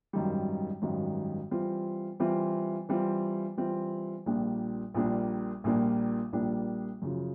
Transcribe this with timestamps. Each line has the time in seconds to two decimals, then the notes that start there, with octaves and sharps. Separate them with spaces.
0.13 G#1 F#2 D#3 G3
0.82 G#1 F#2 D#3 G3
1.51 E3 G3 C4 F4
2.20 E3 G3 C4 F4
2.89 E3 G3 C4 F4
3.57 E3 G3 C4 F4
4.26 A#1 A#2 G3 A#3 D4
4.94 A#1 A#2 G3 A#3 D4
5.64 A#1 A#2 G3 A#3 D4
6.33 A#1 A#2 G3 A#3 D4
7.02 F#2 C#3 F3